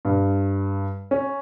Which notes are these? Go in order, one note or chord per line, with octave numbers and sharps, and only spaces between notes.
G2
C#4